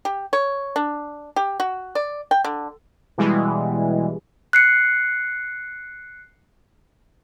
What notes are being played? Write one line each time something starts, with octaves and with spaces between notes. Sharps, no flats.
G4
C#5
D4
G4
F#4
D5
G5
D3
B2 E3 G3 G#3
F#6 C7 C#7